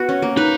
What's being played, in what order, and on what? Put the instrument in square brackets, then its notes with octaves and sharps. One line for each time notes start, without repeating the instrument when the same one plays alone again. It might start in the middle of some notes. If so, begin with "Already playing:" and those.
Already playing: [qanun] B3 F#4 B4
C#4
A#3
[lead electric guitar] D#4 [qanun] B4